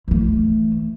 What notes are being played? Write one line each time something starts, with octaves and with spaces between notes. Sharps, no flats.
E3 A3